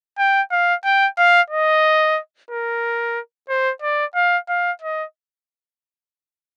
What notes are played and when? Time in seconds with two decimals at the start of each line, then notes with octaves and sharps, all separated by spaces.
0.18 G5
0.51 F5
0.85 G5
1.18 F5
1.50 D#5
2.50 A#4
3.49 C5
3.82 D5
4.15 F5
4.49 F5
4.82 D#5